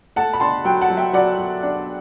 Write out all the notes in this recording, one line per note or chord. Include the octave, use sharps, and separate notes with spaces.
A3 F#5 A5
B5
D4 A5 C6
F#3 G5 B5
F#5 A5
F#3
E5 G5
F#3 D5 F#5
F#3
D4